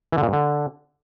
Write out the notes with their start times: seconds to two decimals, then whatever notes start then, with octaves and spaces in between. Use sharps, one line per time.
0.12 E3
0.18 D3
0.23 A#2
0.28 G2
0.33 D3